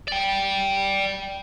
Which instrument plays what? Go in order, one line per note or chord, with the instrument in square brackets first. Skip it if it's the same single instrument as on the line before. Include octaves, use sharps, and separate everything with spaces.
[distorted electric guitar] D5 G5